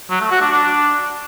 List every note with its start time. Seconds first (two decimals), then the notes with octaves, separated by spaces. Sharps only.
0.10 F#3
0.21 A3
0.31 F#4
0.41 D4
0.52 D4